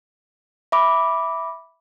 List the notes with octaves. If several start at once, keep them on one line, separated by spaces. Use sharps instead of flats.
E5 B5 D6